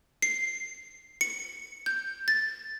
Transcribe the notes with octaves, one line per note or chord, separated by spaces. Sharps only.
C7
C#7
G6
A6